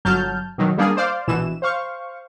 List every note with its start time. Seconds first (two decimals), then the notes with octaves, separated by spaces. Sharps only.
0.05 G1 F#3 A5 F6 G6
0.58 B2 D#3 F#3
0.77 G3 A#3 B3 D4 G#4
0.97 C5 D5 F5
1.28 A#1 B2 E3 E7
1.62 C5 F5 C#6